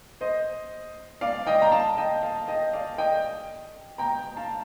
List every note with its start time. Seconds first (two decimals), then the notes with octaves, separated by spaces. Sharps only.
0.21 C5 D#5
1.21 D5 F5
1.47 D#5 G5
1.62 A#5
1.72 F5 A5
1.97 D#5 G5
2.23 F5 A5
2.48 D#5 G5
2.73 D5 F5
2.98 D#5 G5
3.98 G5 A#5
4.36 F5 A5